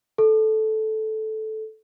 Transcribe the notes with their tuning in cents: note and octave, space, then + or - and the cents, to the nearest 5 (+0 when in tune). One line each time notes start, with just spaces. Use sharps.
A4 -10